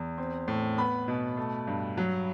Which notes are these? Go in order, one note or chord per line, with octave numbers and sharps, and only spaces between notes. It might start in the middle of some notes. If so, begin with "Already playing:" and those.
Already playing: E2
C4
A2
B3 B5
B2
A3
G2
F#3